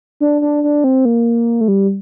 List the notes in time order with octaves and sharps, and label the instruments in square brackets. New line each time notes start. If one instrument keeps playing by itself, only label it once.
[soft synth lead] D4
D4
D4
C4
A#3
A3
G3